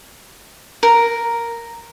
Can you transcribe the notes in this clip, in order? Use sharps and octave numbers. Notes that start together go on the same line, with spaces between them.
A#4